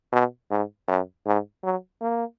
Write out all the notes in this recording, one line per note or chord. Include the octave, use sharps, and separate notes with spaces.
B2
G#2
F#2
G#2
F#3
A#3